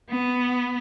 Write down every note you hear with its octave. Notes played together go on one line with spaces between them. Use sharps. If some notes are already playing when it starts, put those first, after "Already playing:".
B3